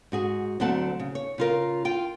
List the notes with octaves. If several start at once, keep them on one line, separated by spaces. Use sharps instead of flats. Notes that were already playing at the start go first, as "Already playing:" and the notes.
G#2 F#4 G#4
D2 F#3 A3 C4 F#5 A5
C#3
C#5
C#3 F4 A#4
F4 G5